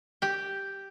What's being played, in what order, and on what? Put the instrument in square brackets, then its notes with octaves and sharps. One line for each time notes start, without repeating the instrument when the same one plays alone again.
[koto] G4 G5